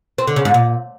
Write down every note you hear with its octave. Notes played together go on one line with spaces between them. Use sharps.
C4
D3
C#3
G#2
A#2